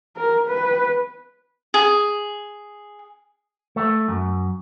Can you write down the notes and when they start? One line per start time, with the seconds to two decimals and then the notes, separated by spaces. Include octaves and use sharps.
0.17 A#4
0.49 B4
1.74 G#4
3.76 A3
4.08 F#2